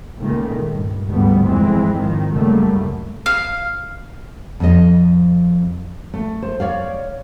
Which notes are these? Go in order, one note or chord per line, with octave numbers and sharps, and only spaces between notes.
C#2 A#2 D#3 A3
G2
D2 G#2 F3 G3 A3 B3
G1 F2 A#2 E3 G#3 C4
G#1 D#3 F3
C#2 F#2 G3 A3 A#3
F5
F2 D#5
A3
C5
C#5 D5 F5